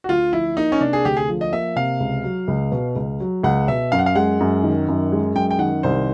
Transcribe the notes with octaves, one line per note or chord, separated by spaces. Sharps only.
F#4
D2 F4
F3 E4
A#3 D#4
C#4
C3 D4
G#4
D2 G4
G#4
F3
D#5
A#3 E5
C3 F5
C#2
F#3
C#2
B2
C#2
F#3
C#2 F#5
B2 E5
F#2 F5
F#5
F5
G#3 F#5
F#2
D#3
F#2
G#3
F#2 G5
G5
D#3 F#5
C2 C5